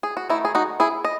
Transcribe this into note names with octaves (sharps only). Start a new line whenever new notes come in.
G#4
F#4
D#3 A3 D#4 E4
G#4
D#4 F#4
E4 G#4
D#5